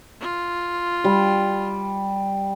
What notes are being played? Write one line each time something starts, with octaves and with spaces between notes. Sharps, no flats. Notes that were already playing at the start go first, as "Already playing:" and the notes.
F4
G3